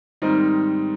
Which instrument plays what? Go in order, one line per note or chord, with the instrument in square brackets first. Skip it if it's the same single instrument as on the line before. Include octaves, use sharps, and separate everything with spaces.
[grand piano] G#2 D#3 G3 C4 D#4